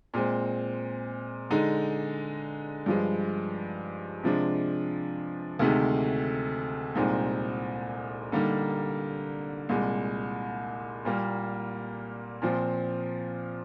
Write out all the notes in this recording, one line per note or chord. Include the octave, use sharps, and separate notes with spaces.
A#2 G#3 C4
D3 G#3 D#4
G2 F3 G#3
C3 F3 G#3 D4
D2 C3 D#3 G#3
C2 A#2 G#3 C4 D#4
D3 G3 A#3 D#4
C2 A#2 G#3
A#2 G3 A#3
A#2 F3 C4